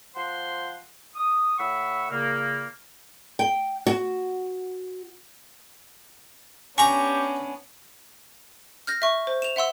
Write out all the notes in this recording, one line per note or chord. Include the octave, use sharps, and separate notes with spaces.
F3 C5 F#5 C6
D#6
A2 F#5 B5 C#6 E6
A#2 C#3 A#3
G5
F#4
B3 C#4 D4 G4 G#5 A#5 C#6
F6 G6 A#6
E5 C#6
C5
E7 F7
E5 F#5 C6 E6